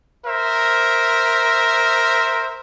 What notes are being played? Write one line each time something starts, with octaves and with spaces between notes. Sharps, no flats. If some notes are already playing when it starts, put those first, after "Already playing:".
A#4 C5 E5